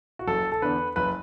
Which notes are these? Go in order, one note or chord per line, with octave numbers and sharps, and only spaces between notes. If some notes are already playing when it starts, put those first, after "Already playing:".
F#4
F#1 A4
A4
E2 D3 B4
F#1 B4